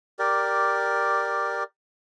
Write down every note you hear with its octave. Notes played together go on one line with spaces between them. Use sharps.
G4 A#4 D5